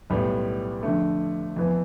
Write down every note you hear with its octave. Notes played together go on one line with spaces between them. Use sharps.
B1 A2 G3 B3
F2 D3 A3
F2 E3 B3